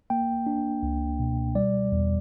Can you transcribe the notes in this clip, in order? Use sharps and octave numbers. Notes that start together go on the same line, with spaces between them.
A#3 G5
D4
C#2
B2
G3 D5
E2